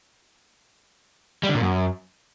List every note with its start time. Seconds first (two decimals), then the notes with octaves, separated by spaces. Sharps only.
1.43 G3
1.49 D3
1.55 A#2
1.60 F#2